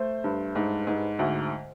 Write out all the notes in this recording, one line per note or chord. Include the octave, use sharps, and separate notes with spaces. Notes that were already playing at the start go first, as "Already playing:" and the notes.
Already playing: A3 C5
G2
G#2
G#2
D2